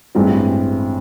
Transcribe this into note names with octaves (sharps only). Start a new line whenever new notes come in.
A1 G2 E3 G#3 C4